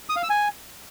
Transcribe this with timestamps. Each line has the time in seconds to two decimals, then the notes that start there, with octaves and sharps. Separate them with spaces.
0.09 D#6
0.16 F5
0.23 E6
0.30 G#5